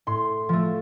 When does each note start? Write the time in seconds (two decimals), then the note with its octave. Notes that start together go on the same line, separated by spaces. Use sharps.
0.07 A2 C6
0.49 F3 A3